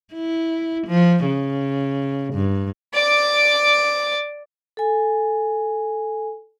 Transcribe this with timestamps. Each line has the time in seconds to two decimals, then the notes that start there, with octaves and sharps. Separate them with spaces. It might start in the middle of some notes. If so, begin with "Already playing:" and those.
0.14 E4
0.87 F3
1.26 C#3
2.34 G2
2.94 D5 D6
4.77 A4 G#5